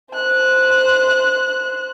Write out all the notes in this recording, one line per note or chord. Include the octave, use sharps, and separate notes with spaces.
C5 F#6